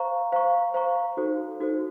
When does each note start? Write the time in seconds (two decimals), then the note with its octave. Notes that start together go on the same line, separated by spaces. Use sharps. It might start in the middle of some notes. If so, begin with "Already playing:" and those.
Already playing: C5 F5 A#5 C#6
0.32 C5 F5 A#5 C#6
0.74 C5 F5 A#5 C#6
1.17 D#4 F#4 A4 C5
1.60 D#4 F#4 A4 C5